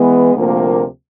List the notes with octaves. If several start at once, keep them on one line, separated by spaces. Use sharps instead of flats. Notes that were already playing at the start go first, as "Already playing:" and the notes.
Already playing: E3 G#3 B3
D2 C3 F3 A#3